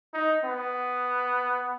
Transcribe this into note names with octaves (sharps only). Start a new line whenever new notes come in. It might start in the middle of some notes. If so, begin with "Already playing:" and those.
D#4
B3